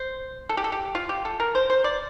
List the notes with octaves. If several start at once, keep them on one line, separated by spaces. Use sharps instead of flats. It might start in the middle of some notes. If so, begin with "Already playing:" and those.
Already playing: C5
A4
G4
A4
G4
F4
G4
A4
A#4
C5
C5
D5